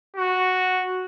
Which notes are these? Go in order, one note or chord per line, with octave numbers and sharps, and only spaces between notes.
F#4